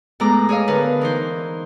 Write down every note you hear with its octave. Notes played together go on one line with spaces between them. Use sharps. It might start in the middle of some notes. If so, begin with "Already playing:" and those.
A2 G#3 B3 E4 A#5 D6
G#4 C#5 D#5 F5
D3 A#4 B4
E3 D#4 C5